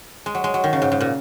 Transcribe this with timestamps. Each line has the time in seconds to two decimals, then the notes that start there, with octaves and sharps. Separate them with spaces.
0.26 G#3
0.35 F#3
0.44 G#3
0.54 F#3
0.64 D#3
0.73 C#3
0.82 G#2
0.92 G#2
1.01 A#2